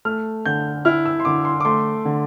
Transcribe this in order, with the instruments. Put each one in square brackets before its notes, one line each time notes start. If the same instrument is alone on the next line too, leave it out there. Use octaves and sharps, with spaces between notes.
[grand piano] A3 [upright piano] F6
[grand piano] D3 [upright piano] G6
[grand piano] E4 [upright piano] F6
[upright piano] E6
C6
[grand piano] D3 [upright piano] D6
[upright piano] C6
D6
[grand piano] A3 [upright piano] C6
[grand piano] D3